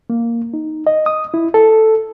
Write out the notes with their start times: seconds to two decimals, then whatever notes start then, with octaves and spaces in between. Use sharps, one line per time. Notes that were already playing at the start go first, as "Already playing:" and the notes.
0.10 A#3
0.54 D#4
0.87 D#5
1.06 D#6
1.34 E4
1.54 A4